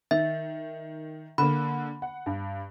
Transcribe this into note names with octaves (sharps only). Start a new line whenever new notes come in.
D#3 E5
D3 A#3 B5
F#5
G2